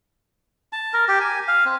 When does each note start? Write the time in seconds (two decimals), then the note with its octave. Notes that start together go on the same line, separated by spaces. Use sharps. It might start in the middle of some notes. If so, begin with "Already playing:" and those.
0.73 A5
0.93 A#4
1.08 G4
1.20 G#5
1.48 F5
1.65 C4